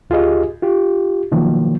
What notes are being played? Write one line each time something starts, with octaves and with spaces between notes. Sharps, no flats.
D2 F4 G4 G#4 D#5
F4 G4
B2 D#3 F3 F#3 A#3